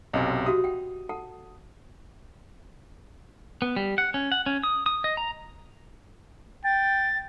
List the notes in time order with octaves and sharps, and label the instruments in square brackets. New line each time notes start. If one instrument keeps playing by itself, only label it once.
[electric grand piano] B1 F#2 C3 [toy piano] D#5 E5 G#5
[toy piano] F#4 G4 E5 [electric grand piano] D#6
[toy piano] F#5 G5
A4 F#5 A5
[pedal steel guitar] B3
G3
F#5
C#4
F#5
C#4
D#6
D#6
D#5
A#5
[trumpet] G5 [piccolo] A6